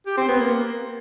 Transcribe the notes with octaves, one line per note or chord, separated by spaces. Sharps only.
G4
C4
B3
A#3